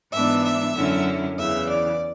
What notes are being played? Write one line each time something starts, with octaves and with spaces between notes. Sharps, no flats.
G#2 E3 G#3 B3 D4 E5
E5
F#2 D3 F#3 C#4 E4
E2 C#3 E3 E5
D5